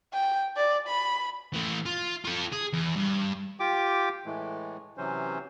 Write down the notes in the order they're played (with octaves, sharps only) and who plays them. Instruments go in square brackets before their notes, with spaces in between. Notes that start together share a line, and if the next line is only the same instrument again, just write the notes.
[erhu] G5
D5
B5
[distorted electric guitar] E3 A3
F4
F4 A4
G#4
E2
G2
[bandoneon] F4 G4 G5 D6
A2 E3 G#3 A3
C3 E3 F#3 C#4 C5